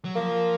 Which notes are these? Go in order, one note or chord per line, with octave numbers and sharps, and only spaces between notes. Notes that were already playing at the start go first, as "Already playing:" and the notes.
F#3
F3 A#3